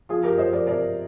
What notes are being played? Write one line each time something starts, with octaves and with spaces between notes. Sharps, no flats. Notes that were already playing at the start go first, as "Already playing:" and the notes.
F3 F4 G#4
G4 A#4
F3 C5 D#5
A#4 D5
C3 A#4 D5